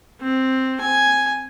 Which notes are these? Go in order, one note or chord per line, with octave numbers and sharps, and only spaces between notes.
C4
G#5